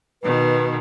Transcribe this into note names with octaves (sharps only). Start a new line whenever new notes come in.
B2 D#3 B4